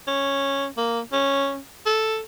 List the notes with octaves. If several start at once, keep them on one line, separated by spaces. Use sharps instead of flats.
C#4
A#3
C#4
A4